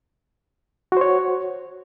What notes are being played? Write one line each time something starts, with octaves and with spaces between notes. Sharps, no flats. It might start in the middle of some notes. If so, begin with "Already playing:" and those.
F#4 C5 C#5